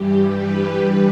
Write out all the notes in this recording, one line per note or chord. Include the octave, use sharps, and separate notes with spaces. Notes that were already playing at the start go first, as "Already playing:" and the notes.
Already playing: G2 E3 G3 G4
B4